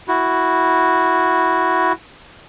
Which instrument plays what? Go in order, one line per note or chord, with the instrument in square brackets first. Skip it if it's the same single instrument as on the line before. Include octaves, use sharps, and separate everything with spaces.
[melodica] E4 F#4